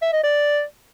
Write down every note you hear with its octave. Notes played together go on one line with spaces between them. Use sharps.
E5
D#5
D5